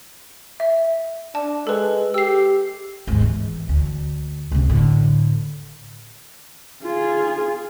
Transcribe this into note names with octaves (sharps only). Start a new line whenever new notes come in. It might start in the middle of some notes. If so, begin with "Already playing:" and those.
E5
D4 A5
G#3 A4 B4
G4 E6 C7
D#2 G#2
E3
D2
C#2 C3
A2 D3
F4 G#4